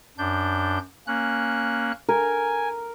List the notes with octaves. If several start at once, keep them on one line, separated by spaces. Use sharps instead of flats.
F#2 D4 G6
A#3 C#4 F#6
A#4 G#5